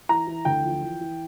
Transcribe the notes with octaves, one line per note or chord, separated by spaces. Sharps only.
E3 A#5
E3
D2 G5
F3
E3
E3